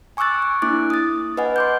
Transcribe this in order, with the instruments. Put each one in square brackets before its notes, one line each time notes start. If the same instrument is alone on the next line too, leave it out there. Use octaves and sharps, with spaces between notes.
[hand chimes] G#5 C#6 D6 E6 F#6 A6
D6
A#3 D4 E4 D6 F#6
D#6 A6
B4 D#5 F#5 G#5
C6 D6 G6